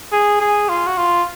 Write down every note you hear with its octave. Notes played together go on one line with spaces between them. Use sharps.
G#4
G#4
F4
F#4
F4